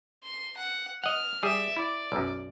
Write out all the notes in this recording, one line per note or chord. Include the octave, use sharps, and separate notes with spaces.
C6
F#5
D#5 F#5 F6
G3 G#4 D5 E5
E4 D5
B1 F#2